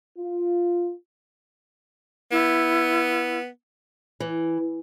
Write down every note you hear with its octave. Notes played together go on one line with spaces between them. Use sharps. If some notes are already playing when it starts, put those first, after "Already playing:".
F4
B3 E4
E3